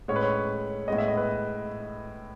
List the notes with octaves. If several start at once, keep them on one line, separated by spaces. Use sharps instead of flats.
A2 G#3 C#4 C#5
B4
C#5
A2 G#3 B3 D#5
E5
D#5
B4